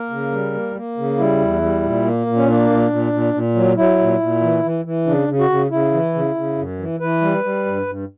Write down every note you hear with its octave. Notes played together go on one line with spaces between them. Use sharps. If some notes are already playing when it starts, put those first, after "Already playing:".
Already playing: A#3 A#4
C#3
G3
A#3
A#3
C#3
G3 E4
E2
G3
A#2
A#3
A#2
C#4
A#3 D4
A#2
A#2
A#2
A#2
F#3
F#3 E4
A#2
A#2
E3
E3
E3
C#3 D4
C#3
F#4
C#3
C#3 E4
E3
C#3
C#3
F#2
E3
E3 B4
G3
G3
G2
G2